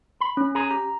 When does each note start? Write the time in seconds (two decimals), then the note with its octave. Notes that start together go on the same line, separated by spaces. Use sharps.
0.21 B5
0.37 C#4
0.55 G#4 G#5 A#5
0.71 G4 A#5